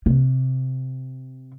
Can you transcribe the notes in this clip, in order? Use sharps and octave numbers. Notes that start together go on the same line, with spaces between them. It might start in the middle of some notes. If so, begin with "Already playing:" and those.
C3